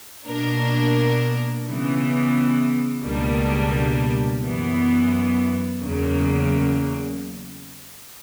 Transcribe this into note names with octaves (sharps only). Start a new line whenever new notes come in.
B2 A#3 D4 A#4
C#3 E3 B3
C#2 B2 G3 A#3 D4
F#2 E3 B3
E2 C#3 F#3 A#3